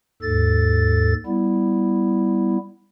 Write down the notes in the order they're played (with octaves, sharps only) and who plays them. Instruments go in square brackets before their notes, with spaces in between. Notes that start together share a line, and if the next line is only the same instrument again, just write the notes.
[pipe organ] D#2 G#2 A4 A6
G3 B3 E4